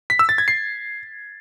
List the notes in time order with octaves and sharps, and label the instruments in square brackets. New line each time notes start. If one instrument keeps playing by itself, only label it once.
[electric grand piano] B6
E6
A6
G#6
C7